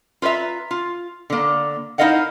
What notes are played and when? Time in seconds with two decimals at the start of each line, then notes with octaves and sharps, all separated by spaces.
0.22 F4 B4 C5 E5 A#5
0.71 F4
1.30 D3 A#3
1.98 D#4 E4 A#4 D#5 F5 F#5